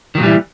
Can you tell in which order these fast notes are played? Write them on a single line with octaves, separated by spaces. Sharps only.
D#3 F#3 A#2 G3 E3